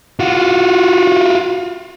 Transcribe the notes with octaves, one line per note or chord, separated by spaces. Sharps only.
F4 F#4